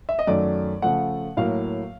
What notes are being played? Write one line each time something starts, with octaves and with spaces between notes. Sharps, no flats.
E5
D#5
F#2 D#3 F#3 A3 D5
C#3 F3 A3 F#5
A2 F#3 A#3 F5